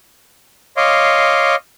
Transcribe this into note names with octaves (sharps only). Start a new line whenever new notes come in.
C#5 D#5 F5 C6 D6